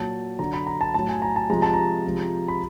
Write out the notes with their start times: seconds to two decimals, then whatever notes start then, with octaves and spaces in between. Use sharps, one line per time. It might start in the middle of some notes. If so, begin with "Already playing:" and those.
Already playing: A#2 F#3 A5
0.39 D3 F#3 A#5
0.53 B5
0.67 A#5
0.81 A5
0.94 A2 F#3 A5
1.09 G#5
1.22 A#5
1.36 A5
1.50 C3 F3 G#3 A#5
1.62 A5
1.74 A#5
2.05 C3 F3 G#3
2.48 B5